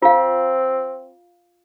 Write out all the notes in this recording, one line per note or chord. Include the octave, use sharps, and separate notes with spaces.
C4 F4 F5